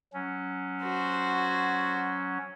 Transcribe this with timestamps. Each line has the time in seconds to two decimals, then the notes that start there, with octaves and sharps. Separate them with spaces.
0.13 F#3 C#4
0.83 F#4 C5